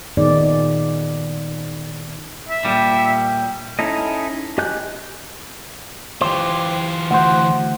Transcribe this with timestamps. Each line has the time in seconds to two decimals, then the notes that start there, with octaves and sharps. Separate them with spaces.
0.17 A#2 D#3 B3 D#4 G#4 D5
2.49 E5
2.65 A#2 G3
3.79 C#4 D#4 E4 A4 D#5
4.58 G4 D#5 G#5 F#6 G6
6.21 E3 F4 G4 C5
7.11 D2 C5 F#5